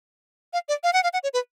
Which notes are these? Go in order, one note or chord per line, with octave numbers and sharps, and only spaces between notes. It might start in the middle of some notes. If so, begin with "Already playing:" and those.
F5
D5
F5
F#5
F5
F#5
C#5
B4